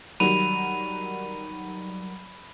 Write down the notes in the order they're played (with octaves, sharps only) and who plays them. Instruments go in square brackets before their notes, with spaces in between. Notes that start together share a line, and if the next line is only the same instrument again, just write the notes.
[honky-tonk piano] D#3 F#3 G3 [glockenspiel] B5 D#7 F7